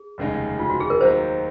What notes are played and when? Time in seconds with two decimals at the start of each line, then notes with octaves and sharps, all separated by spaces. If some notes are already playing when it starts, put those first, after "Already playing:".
Already playing: G#4
0.18 F1 D#2 C#3 G#3 D#4
0.60 F4
0.70 F#4
0.80 G#4
0.90 A#4
1.01 D#2 D#3 F#3 C5